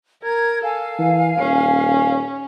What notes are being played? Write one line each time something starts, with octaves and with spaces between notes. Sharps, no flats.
A#4 G#6
A4 F5 G#5
E3
D#1 C#4